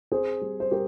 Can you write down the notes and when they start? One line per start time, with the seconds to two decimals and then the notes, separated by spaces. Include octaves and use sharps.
0.12 C4 G#4 C5
0.41 G3
0.60 C5
0.71 G3 G4 A#4